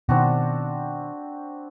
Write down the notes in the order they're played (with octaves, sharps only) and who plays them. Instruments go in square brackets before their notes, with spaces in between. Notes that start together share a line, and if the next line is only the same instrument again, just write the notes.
[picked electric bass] B2 D#3 [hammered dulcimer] C4 D4 F#4